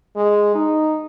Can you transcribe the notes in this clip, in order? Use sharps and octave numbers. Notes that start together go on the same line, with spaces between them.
G#3
D#4